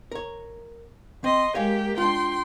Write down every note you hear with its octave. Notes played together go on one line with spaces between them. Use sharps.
A#4 C#5
C4 D#5 C6
G#3 A#3 G4 C#5 F5 G#5
D4 F4 G5 C6